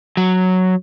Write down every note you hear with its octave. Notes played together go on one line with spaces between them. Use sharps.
F#3